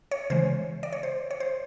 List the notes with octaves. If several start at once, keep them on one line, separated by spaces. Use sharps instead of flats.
C#5
C#3 E3 G#3 C5
D5
C#5
C5
C#5
C5